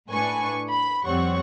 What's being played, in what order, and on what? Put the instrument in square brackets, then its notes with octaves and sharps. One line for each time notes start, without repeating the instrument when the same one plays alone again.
[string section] A2 D4 B4 G#5 C#6
B5
F2 G3 C4 C#5 F#5 C#6